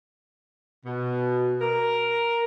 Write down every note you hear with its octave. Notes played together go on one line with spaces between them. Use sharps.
B2
A#4